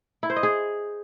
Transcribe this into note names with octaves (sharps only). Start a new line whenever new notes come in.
E4
C5
D#5
G#4